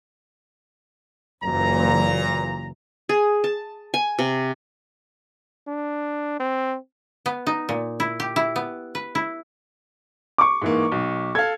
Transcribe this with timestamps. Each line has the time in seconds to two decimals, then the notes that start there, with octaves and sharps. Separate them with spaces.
1.44 F#1 A#2 E3 A#5
3.09 G#4
3.44 A5
3.94 G#5
4.19 C3
5.68 D4
6.40 C4
7.26 B3
7.46 D#4
7.69 A#2
8.00 E4
8.20 G4
8.36 E4
8.56 B3
8.95 B4
9.15 E4
10.38 C#6 D6
10.62 G#2 E3 A#3
10.92 B1
11.35 A4 F5 G#6